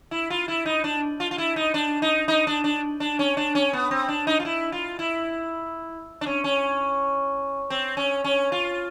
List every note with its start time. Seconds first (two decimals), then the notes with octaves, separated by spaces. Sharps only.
0.11 E4
0.30 F4
0.48 E4
0.66 D#4
0.84 D4
1.20 F4
1.31 F4
1.38 E4
1.56 D#4
1.74 D4
2.02 D#4
2.28 D#4
2.47 D4
2.64 D4
3.00 D4
3.19 C#4
3.37 D4
3.55 C#4
3.73 B3
3.91 C4
4.09 D4
4.27 D#4
4.40 F4
4.45 E4
4.72 F4
4.99 E4
6.21 D4
6.26 C#4
6.44 C#4
7.70 C4
7.97 C#4
8.24 C#4
8.52 F4